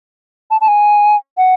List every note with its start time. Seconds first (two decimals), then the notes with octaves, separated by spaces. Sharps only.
0.51 A5
0.61 A5
0.68 G#5
1.38 F#5